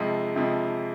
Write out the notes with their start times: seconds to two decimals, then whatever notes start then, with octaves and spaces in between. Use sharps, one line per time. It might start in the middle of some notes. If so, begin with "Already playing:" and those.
Already playing: F2 C3 F3 G#3
0.36 F2 C3 F3 G#3